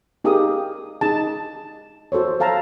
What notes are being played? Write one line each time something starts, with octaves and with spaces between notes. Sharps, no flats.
D#4 G4 G#4 A#4 F5 D#6
D#4 G#4 A5
F#4 A4 C5 C#5
A4 F5 A5 A#5